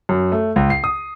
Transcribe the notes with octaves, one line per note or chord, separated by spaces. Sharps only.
F#2
A3
C#2
C7
D#6